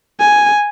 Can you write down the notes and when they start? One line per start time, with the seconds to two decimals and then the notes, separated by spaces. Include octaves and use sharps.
0.20 G#5